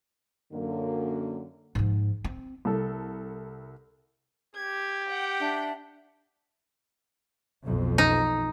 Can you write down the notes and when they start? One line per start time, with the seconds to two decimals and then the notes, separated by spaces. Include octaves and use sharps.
0.52 F#2 D3 A#3
1.75 G#2 F3
2.24 C4
2.65 C2 A4
4.56 G4 G#6
5.09 F#5 G5
5.40 D4 E5
7.64 B1 F2
7.98 D#4